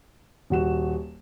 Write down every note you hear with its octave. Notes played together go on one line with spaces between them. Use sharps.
D#1 F#4 E7